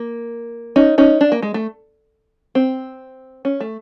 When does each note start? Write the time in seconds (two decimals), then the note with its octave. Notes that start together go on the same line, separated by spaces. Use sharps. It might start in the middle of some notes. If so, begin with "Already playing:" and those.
Already playing: A#3
0.76 C#4 D#4
0.98 C#4 D#4
1.21 D4
1.32 A#3
1.42 G#3
1.54 A3
2.55 C4
3.45 C#4
3.60 A3